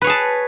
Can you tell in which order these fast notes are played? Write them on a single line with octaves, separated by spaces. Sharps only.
B4 C#5 G#4 A5